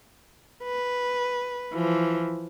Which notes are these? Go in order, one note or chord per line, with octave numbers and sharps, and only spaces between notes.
B4
E3 F3